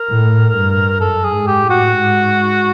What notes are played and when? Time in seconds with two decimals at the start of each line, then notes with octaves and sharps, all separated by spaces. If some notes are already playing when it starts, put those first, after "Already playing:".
Already playing: A#4
0.10 A2
0.56 G2
1.01 F#2 A4
1.24 G#4
1.32 G#2
1.47 G4
1.62 A2
1.70 F#4
1.92 G#2